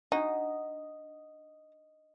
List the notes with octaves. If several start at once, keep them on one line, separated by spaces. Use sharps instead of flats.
D4 D#4 F#4 D#5 F#5